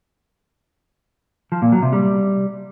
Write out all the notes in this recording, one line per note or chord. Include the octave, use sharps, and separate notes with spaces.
F3
A#2
F#3
C3
G3